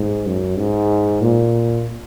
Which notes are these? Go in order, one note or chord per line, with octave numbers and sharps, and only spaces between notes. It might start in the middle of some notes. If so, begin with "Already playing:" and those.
Already playing: G#2
F#2
G#2
A#2